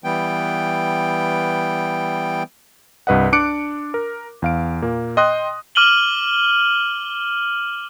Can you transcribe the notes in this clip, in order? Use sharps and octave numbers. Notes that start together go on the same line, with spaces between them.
E3 G3 B3 G5
C2 G2 B4 D#5 F#5
D4 D6 F#6 C#7 D7
A#4
E2 F5 D7
A#2 A#3
D#5 G5 C6 D#6 F#6 A#6
D6 F6 D#7 F#7 G7